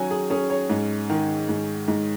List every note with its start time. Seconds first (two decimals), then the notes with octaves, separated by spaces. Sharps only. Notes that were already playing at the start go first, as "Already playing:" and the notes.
Already playing: D#3 F#3 C#4 G#5
0.11 G#4
0.30 C#4 G#4
0.50 C#5
0.70 G#2
1.10 D#3
1.49 G#2
1.88 G#2